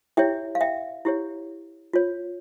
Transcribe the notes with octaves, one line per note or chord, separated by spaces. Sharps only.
E4 G4 C#5 E5 G5
F5
E5 G5
E4 G4 C#5
F4 C#5